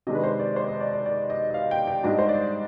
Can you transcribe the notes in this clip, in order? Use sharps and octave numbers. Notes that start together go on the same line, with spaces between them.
C3 D#3 G#3 D4 D#5
B4
C5
D5
C5
D#5
D5
D5
D5
D#5
D#5
F5
G5
G5
G#2 G3 D4 D#5
C5
D5